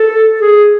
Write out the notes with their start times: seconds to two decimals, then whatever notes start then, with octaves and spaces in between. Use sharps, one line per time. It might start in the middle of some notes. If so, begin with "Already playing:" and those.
Already playing: A4
0.41 G#4